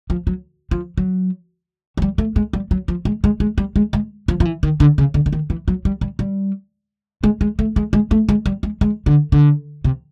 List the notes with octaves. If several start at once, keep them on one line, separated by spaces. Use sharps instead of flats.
F3
F#3
F3
F#3
F#3
G3
A3
G#3
G3
F#3
F3
G#3
G#3
G#3
G3
G#3
G#3
F3
F3
E3
D#3
D3
C#3
D3
D3
D#3
E3
F#3
G3
G3
G3
G#3
G#3
A3
G#3
G#3
A3
G#3
G3
G#3
G#3
D3
D3
C3